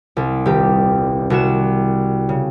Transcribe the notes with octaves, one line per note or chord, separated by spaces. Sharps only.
C2
D#1 G4
C2 F#4 E7
C#3